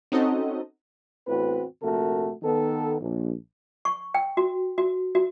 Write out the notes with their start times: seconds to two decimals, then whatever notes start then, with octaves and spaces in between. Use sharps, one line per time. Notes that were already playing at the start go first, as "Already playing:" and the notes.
0.12 C4 C#4 D#4 F#4 A4 D#5
1.27 E2 A2 C4 F#4 B4
1.82 A#1 C3 A3 F#4 A4 A#4
2.43 D#3 B3 A4
3.00 A#1
3.85 C#6
4.14 G5
4.37 F#4
4.78 F#4
5.15 F#4